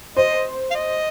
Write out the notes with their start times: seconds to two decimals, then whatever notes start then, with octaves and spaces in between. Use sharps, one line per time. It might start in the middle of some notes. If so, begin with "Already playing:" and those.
0.17 C5 D#5
0.71 F5
0.75 D#5